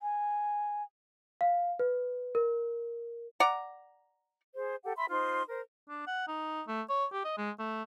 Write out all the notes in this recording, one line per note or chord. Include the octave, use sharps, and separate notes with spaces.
G#5
F5
B4
A#4
D5 F#5 A#5
G#4 C5
G4 A4 F#5
E5 B5 C6
D#4 F4 C5 C6
A#4 C5
D4
F#5
D#4
A3
C#5
G4
D#5
G#3
A3